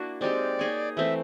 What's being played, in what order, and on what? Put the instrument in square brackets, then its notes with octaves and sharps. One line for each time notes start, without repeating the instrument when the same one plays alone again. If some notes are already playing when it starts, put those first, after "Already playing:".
Already playing: [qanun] A#3 D4 E4 F#4
[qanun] G#3 C4 D#4 G4 [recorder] D5
[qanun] A#3 D#4 G#4 C#5
[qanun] E3 A3 C4 [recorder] E5